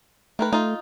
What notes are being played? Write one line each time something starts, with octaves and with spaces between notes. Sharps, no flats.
D#3 A3 A#4 B4
A3 D#4 F4